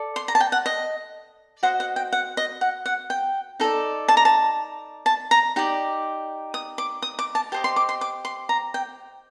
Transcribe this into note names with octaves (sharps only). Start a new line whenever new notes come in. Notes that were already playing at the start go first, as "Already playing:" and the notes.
Already playing: A4 D5
C6
A#5
A5
G5
F#5
D#5
F#4 C5 D#5 F#5
F#5
G5
F#5
D#5
F#5
F#5
G5
D#4 A4 D5
A5
A#5
A5
A5
A#5
D#4 G4 D5
D#6
D6
D#6
D6
A5
G4 C5 D#5 A5
C6
D6
C6
D6
C6
A#5
G5